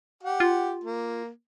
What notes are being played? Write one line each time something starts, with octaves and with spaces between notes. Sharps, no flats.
G4 F#5
F4
A#3